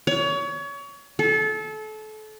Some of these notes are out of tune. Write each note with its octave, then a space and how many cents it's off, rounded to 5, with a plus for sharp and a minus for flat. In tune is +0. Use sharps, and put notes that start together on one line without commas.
C#5 +30
A4 -30